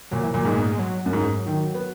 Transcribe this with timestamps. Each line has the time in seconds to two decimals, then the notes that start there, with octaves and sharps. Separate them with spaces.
0.11 A#2 F#3
0.23 E3
0.34 A#2 F#3
0.45 G#2 G#3
0.57 B3
0.65 A#3
0.72 G#3
0.79 F#3
1.06 F#2
1.13 G#2
1.47 D#3
1.74 B3